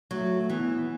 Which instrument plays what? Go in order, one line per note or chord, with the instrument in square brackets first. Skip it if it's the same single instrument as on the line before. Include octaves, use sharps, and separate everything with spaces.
[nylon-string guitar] F#3 [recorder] A3
[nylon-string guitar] E3 [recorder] B3